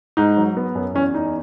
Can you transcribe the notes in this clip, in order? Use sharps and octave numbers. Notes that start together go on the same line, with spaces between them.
G#2 D#4
F#3
B3
F#2
E2 C#4
E2 D#4